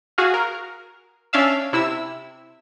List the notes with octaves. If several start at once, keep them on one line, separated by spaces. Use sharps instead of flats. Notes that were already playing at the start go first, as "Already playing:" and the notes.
F#4 G#4 F5
A#4
C#4 D4 E5 F5 E6
C3 E4 E6